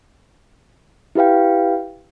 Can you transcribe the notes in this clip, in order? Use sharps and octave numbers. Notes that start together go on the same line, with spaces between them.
E4 G4 B4 F5 G5